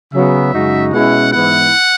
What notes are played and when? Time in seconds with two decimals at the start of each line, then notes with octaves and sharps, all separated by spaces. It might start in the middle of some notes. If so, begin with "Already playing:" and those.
0.13 C#3 F#3 B3 E5
0.53 F#2 C#3 G#3 D#4 F#4
0.93 B2 G#3 C#4 E4 F#5
1.33 G#2 E3 B3 E4 F#5